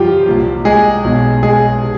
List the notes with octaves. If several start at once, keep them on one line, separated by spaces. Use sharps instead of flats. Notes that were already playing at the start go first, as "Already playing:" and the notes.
Already playing: F#2 C#3 E3 F3 G3 F4 G4
C2 A#2 G3
G#3 G#4
B1 B2 G#3
G#3 G#4
C3